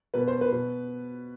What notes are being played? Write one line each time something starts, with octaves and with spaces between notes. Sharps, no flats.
B2 B4
C5
B4
B2